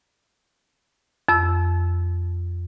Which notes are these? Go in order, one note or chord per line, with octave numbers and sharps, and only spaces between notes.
F2 E6